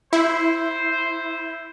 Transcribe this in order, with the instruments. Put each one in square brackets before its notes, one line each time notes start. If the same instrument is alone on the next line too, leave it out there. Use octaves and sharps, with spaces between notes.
[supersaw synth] E4 [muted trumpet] C5